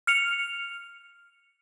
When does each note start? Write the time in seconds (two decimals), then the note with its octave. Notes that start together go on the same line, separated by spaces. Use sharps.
0.07 F6 C#7 F7